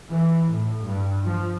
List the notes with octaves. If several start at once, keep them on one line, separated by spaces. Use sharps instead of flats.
E3
A2
G2
F3